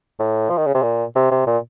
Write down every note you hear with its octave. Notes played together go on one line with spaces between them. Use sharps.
A2
F3
D#3
C#3
C3
A#2
C3
C3
A#2